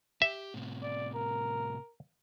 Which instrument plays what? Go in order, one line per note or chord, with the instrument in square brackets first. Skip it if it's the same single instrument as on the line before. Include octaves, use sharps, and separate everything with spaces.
[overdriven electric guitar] G4 [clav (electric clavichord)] E5
[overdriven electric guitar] A2 C3
[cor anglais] D5
A#4